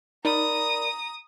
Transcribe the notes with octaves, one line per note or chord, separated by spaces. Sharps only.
D#4 A#4 D5 A#5 B5 D#6